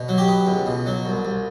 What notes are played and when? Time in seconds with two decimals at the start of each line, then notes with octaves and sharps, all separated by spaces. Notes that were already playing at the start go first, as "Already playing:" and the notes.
Already playing: B2
0.08 F#3
0.18 G4
0.28 B3
0.47 C#2
0.66 B2
0.86 F#3
1.05 C2
1.25 C2